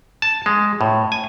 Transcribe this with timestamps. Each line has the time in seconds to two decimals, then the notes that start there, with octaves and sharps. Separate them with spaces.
0.22 A5
0.46 G#3
0.81 A2
1.12 G#5